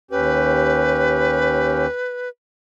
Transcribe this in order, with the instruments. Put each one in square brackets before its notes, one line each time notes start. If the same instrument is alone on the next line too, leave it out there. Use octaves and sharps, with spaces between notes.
[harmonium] D#2 C#4 G4 [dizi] B4